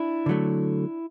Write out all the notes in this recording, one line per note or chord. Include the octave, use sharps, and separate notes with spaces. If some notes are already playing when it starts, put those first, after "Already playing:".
Already playing: D4 E4
D3 F#3 A3